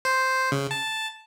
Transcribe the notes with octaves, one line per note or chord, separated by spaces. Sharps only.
C5
C#3
A5